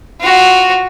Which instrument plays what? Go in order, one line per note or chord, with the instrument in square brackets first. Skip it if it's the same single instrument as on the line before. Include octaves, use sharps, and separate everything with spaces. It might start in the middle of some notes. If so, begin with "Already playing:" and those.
[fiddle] F4 F#4